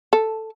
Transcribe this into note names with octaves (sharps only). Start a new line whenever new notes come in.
A4